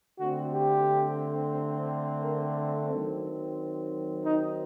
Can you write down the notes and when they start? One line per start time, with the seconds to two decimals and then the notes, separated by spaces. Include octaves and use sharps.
0.19 D3 A3 C4 F#4
0.53 G4
2.23 A#4
2.57 A4
2.90 D#3 F#3 C4
4.25 D#4